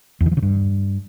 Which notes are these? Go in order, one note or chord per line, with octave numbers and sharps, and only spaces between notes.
E2
D#3
F3
C#3
G2